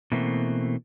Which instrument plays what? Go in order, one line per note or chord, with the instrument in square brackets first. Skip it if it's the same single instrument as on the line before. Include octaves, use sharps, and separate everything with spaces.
[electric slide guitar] B2 E3 A3 A#3 C4